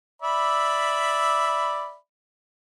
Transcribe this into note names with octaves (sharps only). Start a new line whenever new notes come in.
D5 E5 B5